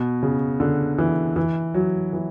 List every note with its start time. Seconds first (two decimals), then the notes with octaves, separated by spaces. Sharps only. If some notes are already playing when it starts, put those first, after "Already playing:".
Already playing: B2
0.23 C#3
0.60 D3
0.98 E3
1.36 E3
1.74 F#3
2.13 E3